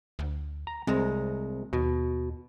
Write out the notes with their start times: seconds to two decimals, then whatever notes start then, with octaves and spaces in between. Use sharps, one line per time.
0.19 D2
0.67 A#5
0.87 C2 G#3 C4 A#5
1.73 D#2 B2